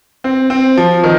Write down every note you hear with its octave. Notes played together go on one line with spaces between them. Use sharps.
C4
C4
F3
D#3